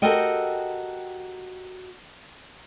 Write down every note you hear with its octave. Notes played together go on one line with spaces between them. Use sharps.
F#4 G4 A4 A#4 D#5 G5